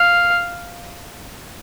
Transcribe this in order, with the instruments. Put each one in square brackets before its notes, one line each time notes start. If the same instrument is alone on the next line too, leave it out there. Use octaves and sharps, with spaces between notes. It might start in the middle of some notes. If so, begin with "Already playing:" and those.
Already playing: [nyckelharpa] F5